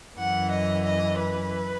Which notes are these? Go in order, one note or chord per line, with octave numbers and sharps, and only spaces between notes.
F#2 E3 F#5
D#5
D#5
B4